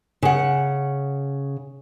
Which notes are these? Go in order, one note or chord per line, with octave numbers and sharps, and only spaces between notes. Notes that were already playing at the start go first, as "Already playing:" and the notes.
C#3 F#5